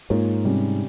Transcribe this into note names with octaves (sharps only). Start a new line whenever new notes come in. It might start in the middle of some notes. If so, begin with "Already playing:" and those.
G#2 A#3 F4 A#4 C#5
C3 G3 C#4